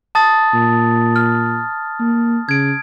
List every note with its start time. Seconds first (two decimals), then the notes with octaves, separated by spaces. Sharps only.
0.15 A5 D#6 A6
0.53 A#2
1.16 F6
2.00 A#3
2.49 C#3 G#6 D7